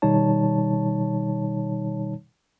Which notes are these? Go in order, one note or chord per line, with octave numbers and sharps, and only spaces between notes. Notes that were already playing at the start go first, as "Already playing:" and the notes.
B2 D#3 G3 D#4 C#5 A5